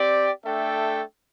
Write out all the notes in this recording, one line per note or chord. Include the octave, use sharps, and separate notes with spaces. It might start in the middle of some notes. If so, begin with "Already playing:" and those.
Already playing: C4 G4 D5 G5
A3 D4 A4 E5 G5